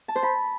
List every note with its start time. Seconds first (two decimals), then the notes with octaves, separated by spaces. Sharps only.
0.08 A5
0.16 C5
0.23 B5